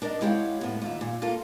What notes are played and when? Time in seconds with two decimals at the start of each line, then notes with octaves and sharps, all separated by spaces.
0.02 D4 A#4 B4 D5 D#5
0.21 G#3 E4 G4 C#5 F5 F#5
0.61 A2 B3
0.82 D#2 F4 E5
1.01 A#2
1.22 A#3 F4 A4 F5